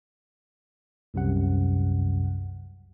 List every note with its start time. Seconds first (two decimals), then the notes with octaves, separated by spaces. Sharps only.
1.14 C2 F#2 C3 F#5